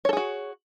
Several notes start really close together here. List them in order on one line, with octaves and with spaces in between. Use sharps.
C#5 A4 G#4 F#4